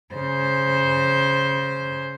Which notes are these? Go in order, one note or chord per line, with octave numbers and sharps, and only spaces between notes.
C#3 C5